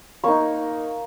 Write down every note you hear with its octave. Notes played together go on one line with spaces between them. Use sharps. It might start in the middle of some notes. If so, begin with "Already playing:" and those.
A#3 D#4 C#6